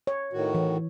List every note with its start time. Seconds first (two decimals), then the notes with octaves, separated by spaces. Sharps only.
0.07 C#5
0.33 A2 D#3 F#4
0.55 E3